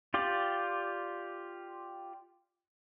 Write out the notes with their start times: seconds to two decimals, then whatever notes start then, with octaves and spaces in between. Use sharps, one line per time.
0.14 F4 G4 D5